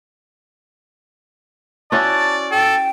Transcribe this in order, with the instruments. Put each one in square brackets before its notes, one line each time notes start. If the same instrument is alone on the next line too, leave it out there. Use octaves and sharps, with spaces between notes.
[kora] C#4 E4 F#4 [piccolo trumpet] D5 [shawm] A5
[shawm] A4 [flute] G5